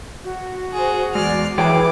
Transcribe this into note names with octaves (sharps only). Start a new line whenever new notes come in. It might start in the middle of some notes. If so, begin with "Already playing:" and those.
F#4
G#4 C5
E2 G#3 D5 F6 C7
E3 G#4 C#5 G5 D6